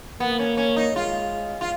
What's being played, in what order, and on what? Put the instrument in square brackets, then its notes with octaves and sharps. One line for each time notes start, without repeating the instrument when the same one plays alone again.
[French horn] A#3 [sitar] B3
[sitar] C#4
C#4
D#4
[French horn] G#3 [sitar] F4
[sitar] F4